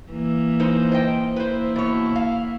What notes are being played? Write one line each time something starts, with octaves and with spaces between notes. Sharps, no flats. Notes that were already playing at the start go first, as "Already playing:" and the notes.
E3 A#3
D#4 B4 C5
C5 D#5 G5
A#3 E4 B4 C5
B2 C#5
F5